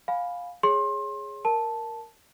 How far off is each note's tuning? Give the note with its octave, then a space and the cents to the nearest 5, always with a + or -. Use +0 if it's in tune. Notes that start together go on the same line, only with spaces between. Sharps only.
F5 +15 G#5 +0 B5 +0
G#4 +0 C#5 +0 C6 +25
A#4 +0 A5 -5